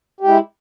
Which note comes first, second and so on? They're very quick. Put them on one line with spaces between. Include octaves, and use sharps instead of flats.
G4 G#3 E4